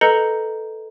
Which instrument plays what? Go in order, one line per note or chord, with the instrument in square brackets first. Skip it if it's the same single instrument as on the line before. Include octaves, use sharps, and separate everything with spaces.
[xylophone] A4 B4 D#5 A#5 G6 C#7